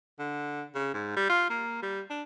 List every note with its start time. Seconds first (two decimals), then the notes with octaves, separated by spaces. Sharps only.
0.19 D3
0.75 C#3
0.94 G#2
1.16 G3
1.30 F4
1.50 A#3
1.82 G3
2.10 D4